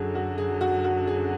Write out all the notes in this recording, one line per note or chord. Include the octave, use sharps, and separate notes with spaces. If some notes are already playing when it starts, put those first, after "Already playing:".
Already playing: F#2 D3 F#3 G#4 A4
F#4
G#4
F#4
F#4
G#4